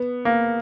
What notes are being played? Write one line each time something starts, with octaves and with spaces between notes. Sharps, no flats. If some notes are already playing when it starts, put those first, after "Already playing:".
Already playing: B3
A#3